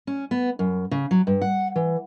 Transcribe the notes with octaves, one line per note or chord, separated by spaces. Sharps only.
C#4
B3
F#2
C#3
F#3
G2
F#5
E3